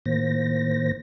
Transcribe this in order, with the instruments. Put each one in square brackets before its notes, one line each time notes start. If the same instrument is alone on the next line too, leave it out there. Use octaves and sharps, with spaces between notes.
[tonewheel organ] A2 D#3 A#3 C5 A#6